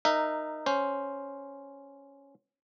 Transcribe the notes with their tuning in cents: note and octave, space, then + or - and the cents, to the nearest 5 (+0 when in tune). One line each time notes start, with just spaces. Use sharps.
D#4 -15 A#4 +0 E5 +0
C#4 +0 C5 +0